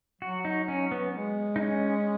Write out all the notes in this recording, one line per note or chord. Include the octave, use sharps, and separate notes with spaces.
F#3 F#4
D#4
C#4
B3
G#3
D#4
C#4